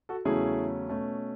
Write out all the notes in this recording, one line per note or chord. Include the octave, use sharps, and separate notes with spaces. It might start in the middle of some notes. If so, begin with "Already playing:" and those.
F#4 A4
E2 C#3 F#3 A3 C#4 E4 G#4
B2 A3 C#4